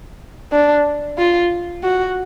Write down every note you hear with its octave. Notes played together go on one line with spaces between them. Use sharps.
D4
F4
F#4